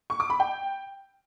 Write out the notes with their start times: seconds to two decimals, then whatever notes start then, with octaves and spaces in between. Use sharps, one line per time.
0.10 C#6
0.20 D6
0.30 B5
0.40 G5